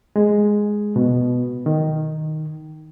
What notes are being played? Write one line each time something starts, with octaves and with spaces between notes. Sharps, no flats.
G#3
B2
D#3